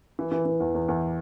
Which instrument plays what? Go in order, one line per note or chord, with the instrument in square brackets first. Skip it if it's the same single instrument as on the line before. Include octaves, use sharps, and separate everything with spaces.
[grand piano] E3
E3
E3
E2
E2
E2